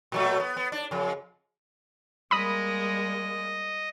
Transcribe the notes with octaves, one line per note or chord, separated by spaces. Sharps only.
A#2 F#3 A3
B3
B3
D4
F2 C#3
G3 G#3 A#3 D#5 B5 D#6